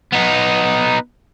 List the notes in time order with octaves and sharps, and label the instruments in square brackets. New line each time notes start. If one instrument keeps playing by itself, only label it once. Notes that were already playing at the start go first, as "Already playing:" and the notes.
[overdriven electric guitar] B3 D#4